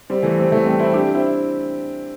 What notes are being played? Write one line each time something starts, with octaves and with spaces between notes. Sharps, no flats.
G3 C4
E3 A3
G3 C4
E3 A3
G3 C4
C4 E4
D4 G4
C4 E4